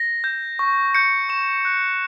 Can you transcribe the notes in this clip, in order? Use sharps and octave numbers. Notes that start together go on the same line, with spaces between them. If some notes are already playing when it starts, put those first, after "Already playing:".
Already playing: A#6
G6
C#6
G6 C#7
C#6 E7
F#6